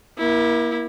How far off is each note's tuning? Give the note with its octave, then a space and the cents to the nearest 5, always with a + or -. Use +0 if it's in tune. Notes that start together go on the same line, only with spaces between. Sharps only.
A#3 +30 E4 -10